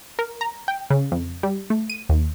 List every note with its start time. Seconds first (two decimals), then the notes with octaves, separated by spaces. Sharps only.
0.19 A#4
0.41 A#5
0.68 G5
0.90 C#3
1.12 F2
1.43 G3
1.70 A3
1.90 D#7
2.09 D#2